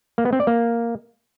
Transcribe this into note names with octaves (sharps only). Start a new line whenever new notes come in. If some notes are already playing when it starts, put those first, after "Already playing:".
A#3
B3
C4
D5
A#3